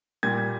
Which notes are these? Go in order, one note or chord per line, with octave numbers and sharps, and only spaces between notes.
A#2 G3 G#6